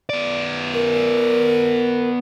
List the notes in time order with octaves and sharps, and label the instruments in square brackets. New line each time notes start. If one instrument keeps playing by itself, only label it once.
[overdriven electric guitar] B3 D5
[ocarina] A#4